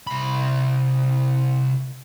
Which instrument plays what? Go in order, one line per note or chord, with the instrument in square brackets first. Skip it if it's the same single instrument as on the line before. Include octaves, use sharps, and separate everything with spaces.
[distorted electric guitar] C2 B5